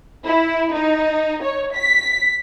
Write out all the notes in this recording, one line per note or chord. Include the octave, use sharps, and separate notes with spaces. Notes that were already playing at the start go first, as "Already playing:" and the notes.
E4
D#4
C#5
B6